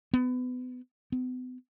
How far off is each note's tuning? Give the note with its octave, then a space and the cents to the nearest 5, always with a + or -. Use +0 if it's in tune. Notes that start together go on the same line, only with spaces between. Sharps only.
B3 +30
B3 +40